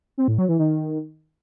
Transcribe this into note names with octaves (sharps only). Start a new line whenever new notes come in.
C4
A2
F#3
E3
D#3